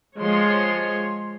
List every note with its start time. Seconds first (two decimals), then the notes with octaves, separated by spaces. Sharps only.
0.18 F3 G#3 C#5 C6